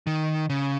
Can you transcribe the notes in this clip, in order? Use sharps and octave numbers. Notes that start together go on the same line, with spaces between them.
D#3
C#3